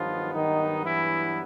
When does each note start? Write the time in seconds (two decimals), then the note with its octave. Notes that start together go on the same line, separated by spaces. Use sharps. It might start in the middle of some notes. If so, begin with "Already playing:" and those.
Already playing: G2 D#3 F3 F#3 B3 F4
0.33 D#3 D#4
0.85 E3 E4